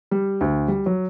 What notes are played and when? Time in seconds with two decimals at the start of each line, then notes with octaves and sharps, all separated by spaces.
0.11 G3
0.41 D2
0.68 G3
0.86 F#3